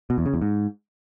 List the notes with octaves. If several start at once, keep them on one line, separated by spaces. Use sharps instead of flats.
B2
E2
C#3
E2
G#2